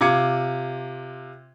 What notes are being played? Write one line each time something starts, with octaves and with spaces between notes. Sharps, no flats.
C3 F4 D6 G#6 C#7